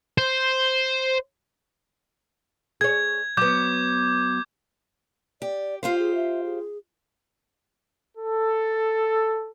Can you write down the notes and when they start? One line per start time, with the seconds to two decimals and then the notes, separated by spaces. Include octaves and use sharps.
0.18 C5
2.81 G#4 C#5 G#6
3.37 F#3 B3 D6 G6
5.42 G4 D5
5.83 F4 G4 C5 F5
5.99 G#4
6.15 E5
6.44 G#4
8.18 A4